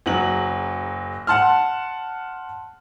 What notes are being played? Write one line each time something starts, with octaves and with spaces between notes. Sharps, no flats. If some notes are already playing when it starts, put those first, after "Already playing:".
F#1 F#3 F#7
F#5 A5 C6 F6